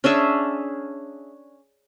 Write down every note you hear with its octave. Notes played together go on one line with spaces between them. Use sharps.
C#4 D4 G#4 E5